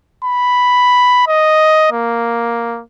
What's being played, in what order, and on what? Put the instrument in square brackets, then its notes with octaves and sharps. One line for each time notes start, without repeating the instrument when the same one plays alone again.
[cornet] B5
D#5
A#3